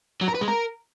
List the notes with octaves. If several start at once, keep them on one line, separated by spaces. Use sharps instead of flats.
F#3
A#4
B4
G#3
A#4